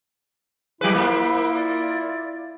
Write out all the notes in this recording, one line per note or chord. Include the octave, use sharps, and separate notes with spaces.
F#3 E4 G#4 B4 F5
A#3 F4 C5 B5
D5